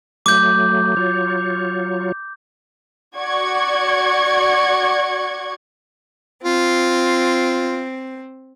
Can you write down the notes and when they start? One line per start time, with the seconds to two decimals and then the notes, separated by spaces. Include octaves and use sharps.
0.26 F#3 A3 D6 G6
0.97 F#3 F4 C#5
3.17 F#4 D5 C#6 G#6
6.44 C4 F4